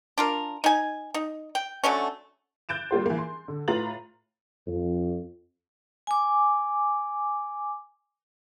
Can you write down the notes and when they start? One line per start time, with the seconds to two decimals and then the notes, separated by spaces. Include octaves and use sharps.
0.18 D4 F4 A#4
0.64 D#4 G#5
1.14 D#4
1.55 G5
1.84 D3 F#3 A3 C#4
2.69 F#6 G6 A6 D7 E7
2.91 G3 A#3 F4 C5
3.06 E3 A#3
3.18 C6
3.48 D3
3.68 A2 F4 B4 A#5 A6 F#7
4.67 F2
6.07 G#5 D6